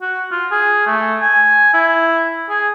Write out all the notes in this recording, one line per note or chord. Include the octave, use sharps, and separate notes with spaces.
F#4
F4
G#4
A3
G#5
E4
G#4